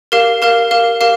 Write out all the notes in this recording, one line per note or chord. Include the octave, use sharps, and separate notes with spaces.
G4 A#4 F5
G4 A#4 F5
G4 A#4 F5
G4 A#4 F5